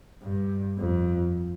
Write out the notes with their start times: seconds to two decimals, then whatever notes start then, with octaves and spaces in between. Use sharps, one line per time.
0.23 G2
0.78 F2